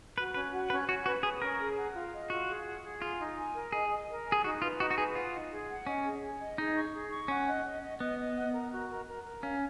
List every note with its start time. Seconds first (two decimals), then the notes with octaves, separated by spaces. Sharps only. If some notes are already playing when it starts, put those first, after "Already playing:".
0.17 F#4 B4
0.34 C#4 B4
0.53 F#4
0.70 C#4 B4
0.89 C#4 F#4
1.06 F#4 B4
1.23 G#4 B4
1.42 C#4 A#4
1.60 G#4
1.77 F#5
1.94 F4
2.13 D#5
2.30 F4 F#4
2.49 G#4
2.66 F#5
2.84 G#4
3.02 F4 G#5
3.20 D#4
3.38 G#5
3.55 A#4
3.72 G#4 D#5
3.91 D#5
4.09 A#4
4.26 G#5
4.32 G#4
4.44 D#4 F#4
4.62 F4 B4
4.80 D#4 F#4
4.91 F#4
4.98 G#4 B4
5.15 F4 F#5
5.33 D#4
5.51 G#4
5.68 F#5
5.87 C#4 D#5
6.05 G#4
6.22 G#5
6.40 D#5
6.58 D#4 G#4
6.76 C#6
6.93 G#4
7.11 C#6
7.28 C#4 F#5
7.47 D#5
7.65 D#5
7.83 D#5
8.00 B3 D#5
8.18 D#5
8.35 F#5
8.53 A#4
8.71 F#4
8.89 A#4
9.07 A#4
9.24 A#4
9.42 C#4 F5